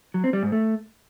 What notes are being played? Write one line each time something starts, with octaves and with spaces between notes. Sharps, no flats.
F#3
C4
G3
G#2
A3